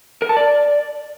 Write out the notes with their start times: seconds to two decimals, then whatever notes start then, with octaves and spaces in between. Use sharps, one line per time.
0.22 A#4
0.29 A5
0.37 D5